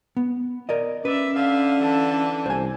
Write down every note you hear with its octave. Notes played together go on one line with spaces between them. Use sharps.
B3
A#4 D5 D#5
C#4 B4 D5 E5
D3 E5 F5
E3 A4
C2 C5 G#5